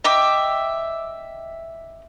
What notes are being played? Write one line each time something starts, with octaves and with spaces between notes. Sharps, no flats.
D#5 E5 G5 D6